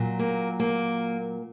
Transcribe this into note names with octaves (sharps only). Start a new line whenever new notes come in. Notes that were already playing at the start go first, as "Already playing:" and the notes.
Already playing: A#2 F#3
A#3
A#3